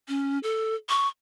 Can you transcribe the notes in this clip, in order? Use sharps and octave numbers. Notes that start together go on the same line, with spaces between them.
C#4
A4
C#6